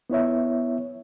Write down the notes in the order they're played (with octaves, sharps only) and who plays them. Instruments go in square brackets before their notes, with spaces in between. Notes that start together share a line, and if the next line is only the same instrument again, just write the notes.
[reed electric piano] B3 E4 C#5 E5